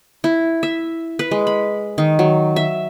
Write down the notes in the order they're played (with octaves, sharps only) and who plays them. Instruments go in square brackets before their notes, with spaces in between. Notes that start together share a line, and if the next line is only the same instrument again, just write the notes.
[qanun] E4
E5
B4
G#3
B5
D#3
F#3
E5